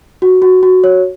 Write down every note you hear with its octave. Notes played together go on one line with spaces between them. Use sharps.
F#4
F#4
F#4
C#5